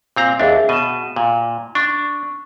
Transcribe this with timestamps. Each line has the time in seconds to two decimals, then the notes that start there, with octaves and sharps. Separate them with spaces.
0.16 A#2 C4 A#5
0.40 D#2 D4 G#4 E5
0.69 B2 D#7 E7
1.16 A#2
1.75 D4 C#6